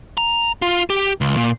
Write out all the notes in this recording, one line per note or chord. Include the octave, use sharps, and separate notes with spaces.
A#5
F4
G4
C#2
A#2